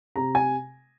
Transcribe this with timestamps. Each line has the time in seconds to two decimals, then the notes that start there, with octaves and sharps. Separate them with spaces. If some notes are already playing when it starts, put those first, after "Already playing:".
0.16 C3 A#5
0.35 G#5